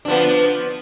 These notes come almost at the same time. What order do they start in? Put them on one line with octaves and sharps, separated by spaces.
D4 F3 B3